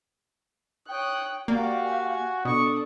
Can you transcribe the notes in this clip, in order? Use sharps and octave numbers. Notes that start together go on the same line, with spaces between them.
C#5 G5 D#6 F#6
A#3 F#4 G4 D5 F5
G#5
B2 D4 A4 C#6 D#6